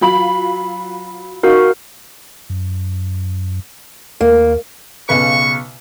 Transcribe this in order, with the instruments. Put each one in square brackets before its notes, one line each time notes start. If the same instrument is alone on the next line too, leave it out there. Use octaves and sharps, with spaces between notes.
[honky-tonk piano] F#3 F4 B5
[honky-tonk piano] D#4 F5 [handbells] F#4 A#4
[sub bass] F#2
[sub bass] D#2 [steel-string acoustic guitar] A#3
[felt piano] B1 C#3 B4 [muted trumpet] C#6